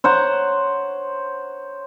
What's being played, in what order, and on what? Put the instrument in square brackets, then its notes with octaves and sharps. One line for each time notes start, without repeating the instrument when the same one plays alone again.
[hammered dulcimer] C5 C#5 F#5 A#5